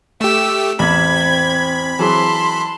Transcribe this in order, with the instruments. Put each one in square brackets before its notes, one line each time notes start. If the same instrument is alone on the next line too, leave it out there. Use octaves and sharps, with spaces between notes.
[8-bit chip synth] A3 G4 [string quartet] E6
[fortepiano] A1 E2 [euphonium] C4 [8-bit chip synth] B5 [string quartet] G#6
[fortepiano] E3 F#3 G#4 [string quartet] A5 C6